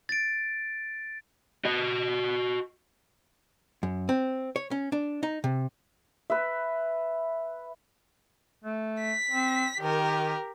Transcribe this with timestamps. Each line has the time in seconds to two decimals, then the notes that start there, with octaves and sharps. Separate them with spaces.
0.09 A6 D7
1.65 F#4 D#5
3.83 F#2
4.09 C4
4.56 C#5
4.71 C#4
4.92 D4
5.23 D#4
5.44 C3
6.30 B4 E5
8.64 A3
9.01 B6
9.31 C4
9.81 D#3 G4 A#4